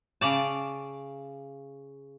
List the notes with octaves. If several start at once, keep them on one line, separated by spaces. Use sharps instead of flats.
C#3 D5 A5